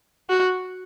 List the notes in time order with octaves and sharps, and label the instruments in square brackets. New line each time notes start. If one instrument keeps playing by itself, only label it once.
[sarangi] F#4